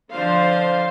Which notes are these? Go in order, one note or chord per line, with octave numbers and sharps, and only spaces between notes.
D3 F3 D4 C5 F5